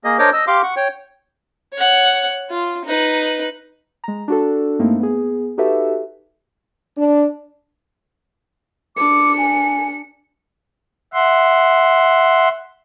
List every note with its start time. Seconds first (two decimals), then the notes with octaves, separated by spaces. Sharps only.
0.04 A#3 G#4 D#5
0.19 D4 A#4 C5 C#5 D#5 D6
0.33 D#5 E6
0.47 G4 F5 C6 D6
0.63 F#5 C#6
0.76 C#5 G5
1.73 C#5 F#5
2.50 F4
2.85 D#4 B4
4.04 G#3 A#5
4.28 D4 F#4 A4
4.79 G2 A3 A#3 C4 D#4 E4
4.99 B3 G#4
5.58 D#4 F#4 G4 A4 B4 E5
6.97 D4
8.97 D4 D6 C#7
9.38 G#5
11.14 E5 F#5 C6